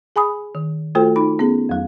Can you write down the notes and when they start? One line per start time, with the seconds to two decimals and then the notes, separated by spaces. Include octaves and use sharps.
0.16 G#4 G#5 B5 D#6
0.55 D#3
0.95 A3 F4 F#4 A4 C5 G5
1.16 D#4 B5
1.39 B3 C#4 G#4
1.69 F2 F#3